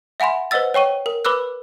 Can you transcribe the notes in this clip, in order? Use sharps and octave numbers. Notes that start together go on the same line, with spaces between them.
E5 F#5 G#5 B5 C6
B4 C5 D#5 F#5 E6 A6
C#5 G5 C#6 D#7
A#4
B4 B5 D6 E6 F#6